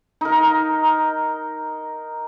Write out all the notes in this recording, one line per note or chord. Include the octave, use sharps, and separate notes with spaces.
D#4 A#4